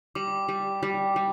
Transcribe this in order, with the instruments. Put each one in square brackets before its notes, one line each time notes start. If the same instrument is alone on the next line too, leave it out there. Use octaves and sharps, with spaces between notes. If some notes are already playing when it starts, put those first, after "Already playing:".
[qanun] G3 [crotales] D6
[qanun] G3
G3
G3